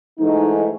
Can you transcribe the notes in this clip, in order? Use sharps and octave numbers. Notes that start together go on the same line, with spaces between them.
G#2 E3 A3 D#4